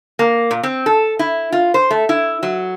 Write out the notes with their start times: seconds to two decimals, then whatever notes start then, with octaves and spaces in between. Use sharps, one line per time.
0.19 A#3
0.51 A#2
0.63 C4
0.86 A4
1.19 E4
1.52 F4
1.74 C5
1.91 A3
2.09 E4
2.43 F#3